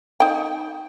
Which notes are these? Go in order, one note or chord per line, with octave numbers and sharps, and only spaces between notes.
D#4 G5